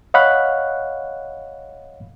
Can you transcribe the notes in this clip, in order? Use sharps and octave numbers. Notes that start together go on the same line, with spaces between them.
C#5 D#5 F5 F#5 B5 F#6